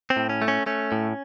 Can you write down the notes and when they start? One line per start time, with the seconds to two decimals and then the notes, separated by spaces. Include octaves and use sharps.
0.10 C4
0.16 A2
0.29 C#4
0.42 A3
0.48 C#4
0.66 A3 C#4
0.92 A2